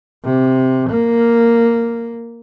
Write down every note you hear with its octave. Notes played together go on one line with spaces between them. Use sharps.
C3
A#3